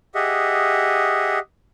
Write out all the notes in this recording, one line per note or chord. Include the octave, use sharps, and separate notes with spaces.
G4 G#4 D#5 E5 F#5